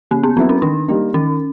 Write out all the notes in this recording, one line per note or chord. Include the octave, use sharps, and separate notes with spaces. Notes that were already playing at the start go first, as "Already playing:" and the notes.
C#3 A#3
B3
F#3 B3 C4 E4
C#4
D#3 D4
G3 A#3 D#4 G4
D#3 C#4